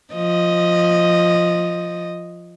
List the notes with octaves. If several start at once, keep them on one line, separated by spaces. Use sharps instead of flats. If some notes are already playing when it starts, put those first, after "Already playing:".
F3 D#5